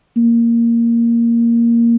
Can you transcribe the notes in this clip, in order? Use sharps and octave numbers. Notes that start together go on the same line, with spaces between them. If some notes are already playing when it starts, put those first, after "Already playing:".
A#3